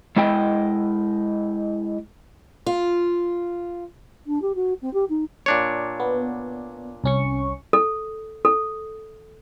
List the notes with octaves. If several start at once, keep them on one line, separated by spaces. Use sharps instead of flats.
G#3 E4 D#5 G5
F4
D4
G4
F#4
C4
G4
D#4
A#2 D4 C#5
B3
C2 C#4 C#6
A4
A4